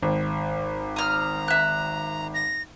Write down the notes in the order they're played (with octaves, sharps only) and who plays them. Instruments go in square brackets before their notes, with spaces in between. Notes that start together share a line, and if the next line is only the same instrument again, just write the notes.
[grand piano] G#1
[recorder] A#5 [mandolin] D#6 F6
[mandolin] E5 F#6
[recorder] A#6